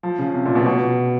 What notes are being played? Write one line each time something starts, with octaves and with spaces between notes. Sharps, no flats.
F3
C#3
C3
A#2
B2
B2